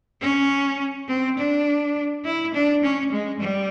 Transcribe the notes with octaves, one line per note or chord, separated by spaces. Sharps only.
C#4
C4
D4
E4
D4
C#4
G#3
G3